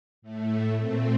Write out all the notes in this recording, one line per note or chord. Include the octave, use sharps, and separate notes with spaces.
A2 A3
A#2 A3 C4